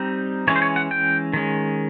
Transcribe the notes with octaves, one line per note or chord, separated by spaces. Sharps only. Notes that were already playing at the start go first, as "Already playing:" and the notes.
Already playing: G3 C4 D#4
E3 G#3 C#4 C#5
C5
C#5
F#5
G5
D#3 G#3 C#4